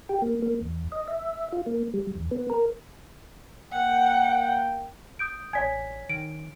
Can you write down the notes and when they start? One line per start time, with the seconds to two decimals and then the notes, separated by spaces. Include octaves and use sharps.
0.09 G4
0.22 A#3
0.42 A#3
0.61 E2
0.92 D#5
1.08 E5
1.52 F4
1.66 A#3
1.94 G3
2.15 E2
2.31 B3
2.50 A#4
3.72 A#3 F#5 G5
5.19 D#6 G6 D7
5.53 A1 C#5 D5 G#5 G#6 B6
6.09 D#3 D7